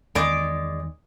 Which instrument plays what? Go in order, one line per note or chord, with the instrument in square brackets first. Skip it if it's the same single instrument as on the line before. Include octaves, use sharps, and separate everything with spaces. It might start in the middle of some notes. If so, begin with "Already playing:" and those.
[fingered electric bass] E2 D#3 [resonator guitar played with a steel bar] G#3 D5